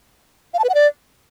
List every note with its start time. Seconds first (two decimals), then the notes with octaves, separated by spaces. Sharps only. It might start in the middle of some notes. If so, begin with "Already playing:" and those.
0.54 F5
0.59 A5
0.64 B4
0.69 F#5
0.74 D5